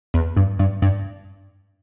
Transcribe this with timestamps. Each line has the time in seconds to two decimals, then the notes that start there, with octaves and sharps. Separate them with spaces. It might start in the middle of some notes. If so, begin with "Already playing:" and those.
0.14 E2
0.37 G2
0.59 G2
0.82 G2